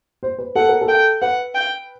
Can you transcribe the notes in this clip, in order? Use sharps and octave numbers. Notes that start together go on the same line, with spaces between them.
C5
B4
A4 F#5
A#4
A4
G5
B4 F#5
G5